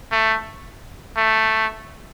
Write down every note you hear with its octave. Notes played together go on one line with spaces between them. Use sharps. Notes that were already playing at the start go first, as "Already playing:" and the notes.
A3
A3